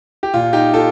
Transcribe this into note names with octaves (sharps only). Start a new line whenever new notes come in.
G4
A#2 F4
D#4 G4
F4 A4